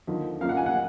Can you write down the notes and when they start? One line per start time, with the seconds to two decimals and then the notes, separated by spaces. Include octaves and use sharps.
0.07 D#2 D3 F3
0.41 F#2 F3 A#3 F5
0.49 F#5
0.57 G#5
0.66 F#5